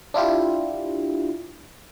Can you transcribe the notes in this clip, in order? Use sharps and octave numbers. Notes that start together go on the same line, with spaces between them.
D4 E4 F4 G4